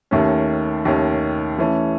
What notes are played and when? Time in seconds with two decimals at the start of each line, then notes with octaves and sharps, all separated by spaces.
0.11 D#2 D#3 A3 C#4
0.85 D#2 D#3 A3 C#4
1.58 E3 A3 C#4